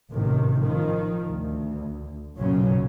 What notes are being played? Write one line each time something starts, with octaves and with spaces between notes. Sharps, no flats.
A1 C3 D#3
D#3 F3
D2
B1 F#2 A#2 C#3 F#3 C#4